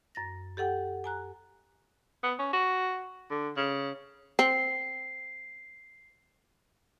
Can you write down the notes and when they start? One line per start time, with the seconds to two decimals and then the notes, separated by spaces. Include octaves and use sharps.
0.15 F#2 A6 A#6
0.57 G4 A4 F#5 G5
1.04 G#5 A#5 F#6
2.23 B3
2.39 C#4
2.53 F#4
3.30 D3
3.57 C#3
4.39 C4 C7